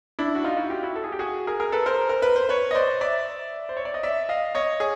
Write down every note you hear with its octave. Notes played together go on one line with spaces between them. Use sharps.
D4 E4
F#4
D#4 F4
E4 F#4
F4 G4
E4 F#4
A4
G#4
G4
F#4 G#4
G#4 A#4
G#4 A#4
A4 B4
A#4 C5
A#4
B4
C5
B4 C#5
D#5
C5 D5
D5 E5
C5
C#5
D5
D#5
D5 E5
D#5 F5
C#5 D#5
G#4